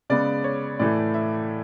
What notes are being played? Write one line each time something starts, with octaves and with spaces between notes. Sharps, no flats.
C#3 G#3 B3 D5
C#5
A2 E3 A3 D5
E5